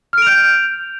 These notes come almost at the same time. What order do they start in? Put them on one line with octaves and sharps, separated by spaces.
F6 D7 F7 G6